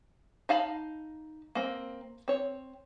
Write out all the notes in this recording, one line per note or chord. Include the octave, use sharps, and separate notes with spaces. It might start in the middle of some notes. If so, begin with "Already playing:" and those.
D#4 F5 A5 B5
A#3 C4
C4 C#5